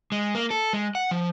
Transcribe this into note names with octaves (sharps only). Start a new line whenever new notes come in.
G#3
A#3
A4
G#3
F#5
F3